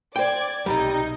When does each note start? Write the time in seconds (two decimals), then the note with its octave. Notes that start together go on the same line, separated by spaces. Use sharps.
0.16 C5 D5 G5 G#6
0.66 B1 C3 G3 D#4 G6